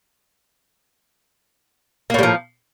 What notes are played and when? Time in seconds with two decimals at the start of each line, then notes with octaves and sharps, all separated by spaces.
2.10 A#3
2.14 A2
2.19 G3
2.23 F3